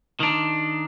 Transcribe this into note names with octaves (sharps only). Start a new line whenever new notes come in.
D#3 D4